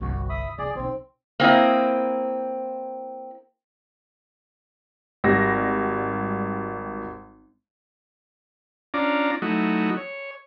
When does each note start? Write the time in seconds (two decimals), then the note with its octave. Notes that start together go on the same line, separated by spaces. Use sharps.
0.01 G1 C2 F#4
0.29 E5 B5 D#6
0.59 C2 G#4 D5
0.75 B1 C4 D#4
1.40 A#3 C4 E4 D#5
5.24 G#1 G3 A#6
8.94 C#4 D4 F4 D5 A#5
9.42 F#3 A3 D#4 E4 F#4
9.97 C#5